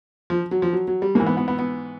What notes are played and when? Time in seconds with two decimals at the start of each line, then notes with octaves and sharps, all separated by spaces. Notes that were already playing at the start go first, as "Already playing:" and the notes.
0.30 F3
0.51 F#3
0.62 F3
0.73 F#3
0.87 F#3
1.02 G3
1.15 G#2 E3 A#3
1.26 B3
1.37 B3
1.48 B3
1.59 B3